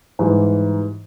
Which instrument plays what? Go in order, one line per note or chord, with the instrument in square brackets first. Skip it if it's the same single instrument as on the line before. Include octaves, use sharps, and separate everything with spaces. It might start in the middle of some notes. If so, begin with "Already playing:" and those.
[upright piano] G#2 E3 G3